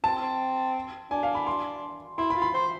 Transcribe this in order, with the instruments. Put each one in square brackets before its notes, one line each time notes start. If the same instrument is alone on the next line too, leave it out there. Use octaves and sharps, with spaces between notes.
[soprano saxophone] C4 [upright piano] A5
[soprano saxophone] C4
[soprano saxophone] D4 [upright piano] G#5
[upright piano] F5
B5
C6
[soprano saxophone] E4 [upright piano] C6
[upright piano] B5
[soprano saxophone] F4
[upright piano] B5
[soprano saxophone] C5